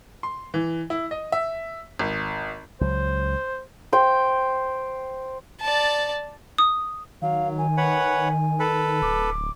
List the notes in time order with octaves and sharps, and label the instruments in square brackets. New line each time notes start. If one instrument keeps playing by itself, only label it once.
[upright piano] C6
E3
E4
D#5
E5
G#1
[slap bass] C#2 F#3 [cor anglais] C5
[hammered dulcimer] C5 G5
[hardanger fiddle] D5 A5
[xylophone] D#6
[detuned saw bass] D#3 [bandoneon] F#3 [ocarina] F5
[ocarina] G#5
[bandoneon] B4 C#5 F#5
A4 B4
[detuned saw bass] D1 [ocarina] D6